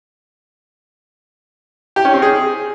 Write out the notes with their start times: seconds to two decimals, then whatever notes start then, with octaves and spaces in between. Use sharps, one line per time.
1.96 G4
2.05 C#4
2.14 C4
2.22 G#4